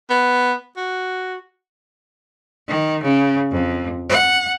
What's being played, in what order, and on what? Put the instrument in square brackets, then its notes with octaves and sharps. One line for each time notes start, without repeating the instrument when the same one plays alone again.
[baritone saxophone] B3
F#4
[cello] D#3
C#3
F2
F#5